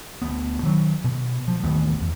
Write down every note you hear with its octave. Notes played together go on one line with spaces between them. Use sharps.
D2 B3
D#3 F#3
B2
F3
A1 D#2 D#3 B3
E2